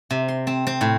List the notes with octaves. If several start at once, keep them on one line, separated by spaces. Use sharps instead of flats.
C3
C6
C4
C4
A2